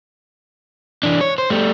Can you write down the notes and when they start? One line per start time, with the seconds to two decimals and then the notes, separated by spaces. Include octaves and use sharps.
1.03 E3 D4
1.21 C#5
1.38 C5
1.50 G3 A3